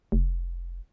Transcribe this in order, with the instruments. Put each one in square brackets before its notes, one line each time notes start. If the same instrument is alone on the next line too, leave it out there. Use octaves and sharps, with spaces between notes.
[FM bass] F1